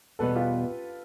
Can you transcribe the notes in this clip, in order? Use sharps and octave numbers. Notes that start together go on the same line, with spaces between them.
E2 B2 G3 B3 A4 B4
F4 G4